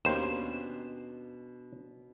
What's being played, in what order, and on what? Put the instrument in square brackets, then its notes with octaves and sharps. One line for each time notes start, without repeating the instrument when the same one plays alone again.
[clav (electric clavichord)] D#2 C5 [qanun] B2 C#4 D4 [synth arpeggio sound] E7